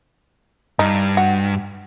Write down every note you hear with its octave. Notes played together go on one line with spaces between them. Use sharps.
G2 D#4
F#4